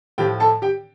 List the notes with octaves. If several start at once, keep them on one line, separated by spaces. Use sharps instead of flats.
A2 F3 G4 G5
A4 A5
G4 G5